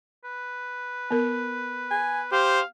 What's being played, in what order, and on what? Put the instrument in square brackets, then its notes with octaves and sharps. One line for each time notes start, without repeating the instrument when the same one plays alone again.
[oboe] B4
[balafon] B3 A#4
[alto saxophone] G#5
[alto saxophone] G4 [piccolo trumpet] C5 [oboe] F5